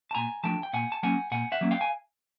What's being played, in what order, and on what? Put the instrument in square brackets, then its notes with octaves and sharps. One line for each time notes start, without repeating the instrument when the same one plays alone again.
[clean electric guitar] A5
A#2 G#5 A#5
F3 A3 D4 G5 A5
G5
A#2 F#5 G#5
A5
F#3 A#3 C#4 F#5 G#5
A#2 F#5 G#5
E5 F#5
F#3 A#3 C#4
F5 G5
G#5